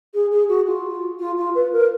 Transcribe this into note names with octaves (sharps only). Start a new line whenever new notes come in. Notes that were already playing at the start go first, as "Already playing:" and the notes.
G#4
G#4
F#4
F4
F4
F4
B4
A#4